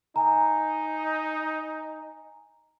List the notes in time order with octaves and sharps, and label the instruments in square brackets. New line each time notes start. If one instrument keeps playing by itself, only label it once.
[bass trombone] D#4 [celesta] G#5 A#5